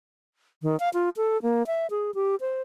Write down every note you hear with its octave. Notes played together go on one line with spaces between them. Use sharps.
D#3
F5
F4
A4
A#3
E5
G#4
G4
C5